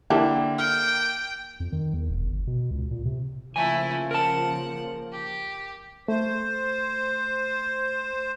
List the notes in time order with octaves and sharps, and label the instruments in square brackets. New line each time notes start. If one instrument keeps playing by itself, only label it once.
[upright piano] D3 [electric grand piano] A#3 [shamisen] E4 G4 A4
[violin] G5 [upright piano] F6
[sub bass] F2
D#3
E2
E1
G1
B2
C#2
A#2
C3
[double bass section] C#3 F3 A#3 [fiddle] A3 E4 [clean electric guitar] G#5
[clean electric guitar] A#4 A5 [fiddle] F#5
[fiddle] G4
[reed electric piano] A3 [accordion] C5